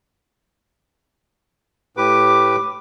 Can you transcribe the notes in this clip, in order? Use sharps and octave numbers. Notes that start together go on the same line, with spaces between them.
A2 G4 B4 D6